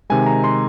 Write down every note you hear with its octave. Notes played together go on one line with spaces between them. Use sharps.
C3 D#3 G#3 G#5
A#5
C6